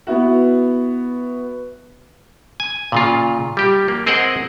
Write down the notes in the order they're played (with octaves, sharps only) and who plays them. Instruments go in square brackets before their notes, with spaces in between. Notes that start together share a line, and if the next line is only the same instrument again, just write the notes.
[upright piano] B3 E4 F#4
[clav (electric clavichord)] G#5
A#2 C#3 F4
G3 G4
A#3
C4 G#4 A#4 C5 D#5 F#5